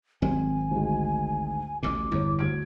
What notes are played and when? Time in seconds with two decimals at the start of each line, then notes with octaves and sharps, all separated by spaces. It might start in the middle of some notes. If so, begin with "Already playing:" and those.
0.22 G#1 F#3 C4 G#5
0.71 D2 G#2
1.83 A1 D2 A2 D6
2.11 G1 E2 E4 C#5
2.39 D2 G#6 D7